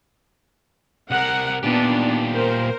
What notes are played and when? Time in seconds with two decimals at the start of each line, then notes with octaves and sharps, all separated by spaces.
1.11 C2 A#4 F#5
1.63 A#2 B3 D4 D#4 G4
2.30 A#4 C5